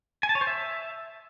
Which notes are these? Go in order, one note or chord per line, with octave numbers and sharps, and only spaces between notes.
G#5
A5
C#5
C5
E5